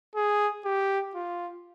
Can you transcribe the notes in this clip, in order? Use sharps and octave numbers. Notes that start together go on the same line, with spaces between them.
G#4
G4
F4